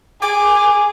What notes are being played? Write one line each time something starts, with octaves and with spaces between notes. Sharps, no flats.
G#4 G#5 D6